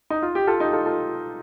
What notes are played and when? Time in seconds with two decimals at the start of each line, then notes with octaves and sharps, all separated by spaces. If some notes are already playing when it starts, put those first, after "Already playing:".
0.10 D#4
0.22 F4
0.35 G4
0.47 F4 A4
0.60 D#4 G4
0.73 F4 A4
0.86 F4 A4